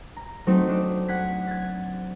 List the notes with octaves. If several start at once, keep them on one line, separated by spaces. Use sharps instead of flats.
A#5
F#3 A3 C4 D#4
D4
F#5 G#6 B6
G#6 A6